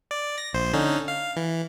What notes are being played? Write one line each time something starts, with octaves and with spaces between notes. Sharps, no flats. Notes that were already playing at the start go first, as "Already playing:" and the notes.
D5
A#6
A#1 C5
D3 C#4 D#4
F5
E3